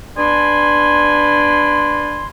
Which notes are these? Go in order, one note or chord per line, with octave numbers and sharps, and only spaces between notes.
B3 D4 D5 G#5 B5 C6